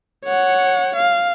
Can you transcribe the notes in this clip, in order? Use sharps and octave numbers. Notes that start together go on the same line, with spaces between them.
C#5 F#5
F5